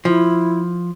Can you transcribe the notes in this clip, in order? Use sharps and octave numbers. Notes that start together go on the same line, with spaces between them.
F3 E4